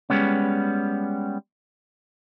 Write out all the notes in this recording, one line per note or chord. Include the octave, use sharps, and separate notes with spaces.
G3 G#3 B3 C#4